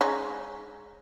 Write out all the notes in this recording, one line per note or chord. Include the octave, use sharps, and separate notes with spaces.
G#3 C#4 D#4